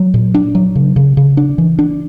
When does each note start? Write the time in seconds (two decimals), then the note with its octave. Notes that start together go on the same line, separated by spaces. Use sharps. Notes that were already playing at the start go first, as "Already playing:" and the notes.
Already playing: F#3
0.14 A#2
0.34 D4
0.55 F#3
0.76 C#3
0.96 C#3
1.17 C#3
1.37 D4
1.58 E3
1.79 D4